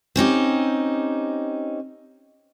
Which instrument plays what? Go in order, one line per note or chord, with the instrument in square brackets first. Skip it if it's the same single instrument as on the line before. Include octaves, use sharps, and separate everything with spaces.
[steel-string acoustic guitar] C4 C#4 D#4 G4